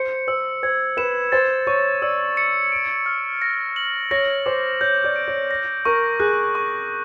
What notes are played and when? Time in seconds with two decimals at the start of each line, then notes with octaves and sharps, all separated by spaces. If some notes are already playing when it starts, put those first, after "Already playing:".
Already playing: C5 C#7
0.28 C5 E6
0.63 C5 G#6
0.97 B4 E7
1.32 C5 A6
1.67 C#5 C#6
2.02 D5 E6
2.37 C#7
2.72 D7
3.06 F6
3.42 A#6
3.76 F#7
4.11 C#5 A#6
4.46 C5 D6
4.81 C#5 G6
5.04 D5
5.16 D7
5.28 C#5
5.51 A#6
5.85 A#4 C#6
6.20 G#4 F#6
6.55 C#6